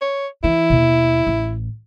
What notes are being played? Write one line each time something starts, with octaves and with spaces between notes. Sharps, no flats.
C#5
E3 E4
D#2 B2
A1